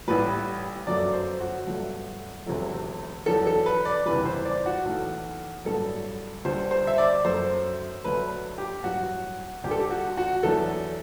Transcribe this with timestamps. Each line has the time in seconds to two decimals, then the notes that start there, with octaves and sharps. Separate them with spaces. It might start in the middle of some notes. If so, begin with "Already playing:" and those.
0.08 A1 A2 G3 B4
0.86 G1 F#2 F#3 A3 D5
1.13 C5
1.41 F#4
1.67 G1 G2 F#3 A3
2.46 E1 D2 C3 F#3 A3
3.26 E2 D3 F#3 A4
3.47 A4
3.66 B4
3.85 D5
4.06 F#1 E2 C3 E3 G3 B4
4.25 C5
4.45 D5
4.66 F#4
4.85 B1 A2 E3 A3
5.65 A1 G2 D3 F#3 A4
6.45 D2 D3 G3 C5
6.71 C5
6.87 E5
6.98 D5
7.25 F#2 F#3 A3 C5
8.04 D2 D3 F#3 A3 B4
8.58 G4
8.84 A1 G2 F#3 F#4
9.64 D2 D3 G3 G4
9.71 A4
9.79 G4
9.91 F#4
10.17 F#4
10.43 E2 D3 F#3 A3 A4